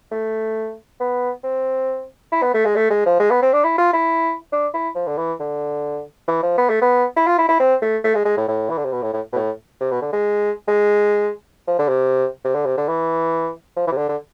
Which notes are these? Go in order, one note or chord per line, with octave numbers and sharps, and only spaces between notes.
A3
B3
C4
E4
B3
A3
G#3
A3
G#3
F3
G#3
B3
C4
D4
E4
F4
E4
D4
E4
F3
D3
E3
D3
E3
F3
B3
A3
B3
E4
F4
E4
E4
C4
A3
A3
G#3
G#3
A2
A2
E3
D3
C3
B2
A2
A2
B2
A2
C3
B2
D3
G#3
G#3
F3
D3
C3
C3
D3
C3
D3
E3
F3
E3
C3
D3
D3